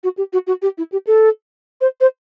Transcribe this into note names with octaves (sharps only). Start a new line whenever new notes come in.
F#4
G4
F#4
F#4
G4
E4
G4
A4
C5
C5